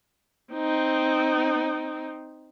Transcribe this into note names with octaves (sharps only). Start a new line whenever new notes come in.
C4 D#4